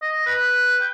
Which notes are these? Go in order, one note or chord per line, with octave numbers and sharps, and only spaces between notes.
D#5
B4
G5